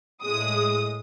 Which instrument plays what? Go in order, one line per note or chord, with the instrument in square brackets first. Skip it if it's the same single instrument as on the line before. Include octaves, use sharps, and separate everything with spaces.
[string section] A2 G#3 D#6